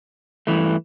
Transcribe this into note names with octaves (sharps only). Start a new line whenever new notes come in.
G2 E3 A3